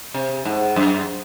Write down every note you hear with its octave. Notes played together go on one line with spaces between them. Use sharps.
C3
G#2
F#2